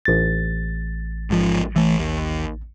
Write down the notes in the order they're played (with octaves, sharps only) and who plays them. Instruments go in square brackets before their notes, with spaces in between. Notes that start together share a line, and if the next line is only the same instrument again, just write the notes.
[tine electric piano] A1 A6
[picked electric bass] G#2 F3
E3 A3
D#2